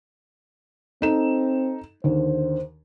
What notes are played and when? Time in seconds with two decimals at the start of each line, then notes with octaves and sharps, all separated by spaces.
1.02 C4 D#4 A4 E7
2.04 D#2 D3 C5